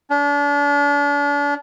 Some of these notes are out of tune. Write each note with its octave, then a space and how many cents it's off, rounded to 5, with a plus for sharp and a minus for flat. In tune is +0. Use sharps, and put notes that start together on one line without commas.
D4 -35